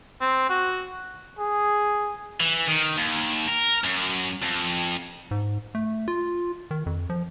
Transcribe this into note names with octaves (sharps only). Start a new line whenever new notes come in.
C4
F#4
G#4
E3
D#3
D#2
A#4
F#2
F2
G#2
A3
F4
D#3
F2
F3